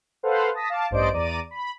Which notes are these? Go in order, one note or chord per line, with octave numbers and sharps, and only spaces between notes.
A4 B4 C5 F5 F#5
A5 D#6 A#6 B6
F5 A5 D6
A1 G2 C5 D5 D#5 D7
E2 D5 A#5 D6 D#7
B5